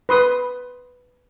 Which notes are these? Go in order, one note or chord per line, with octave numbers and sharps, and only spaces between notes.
B4 C6 D#6